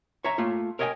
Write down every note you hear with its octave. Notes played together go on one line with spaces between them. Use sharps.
C#5 E5 A#5
A3 A#3 F4
A#4 C#5 D#5 E5 G5 G#5